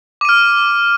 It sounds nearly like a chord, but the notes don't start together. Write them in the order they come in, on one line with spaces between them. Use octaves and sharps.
D6 D#7 F6